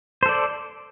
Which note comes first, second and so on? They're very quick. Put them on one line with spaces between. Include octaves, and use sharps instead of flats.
C5 A4 D5